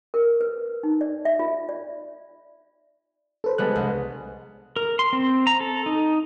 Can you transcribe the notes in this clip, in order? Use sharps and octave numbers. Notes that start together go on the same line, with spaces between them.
A#4
B4
D#4
D5
E5
F4
D5
A4 B4 C5
G3 G#3 B3 A5 F#6
C2
A#4
C6
C4
A#5
A4
D#4